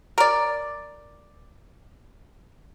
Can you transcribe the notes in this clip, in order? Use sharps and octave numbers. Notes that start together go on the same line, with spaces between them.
A#4 D5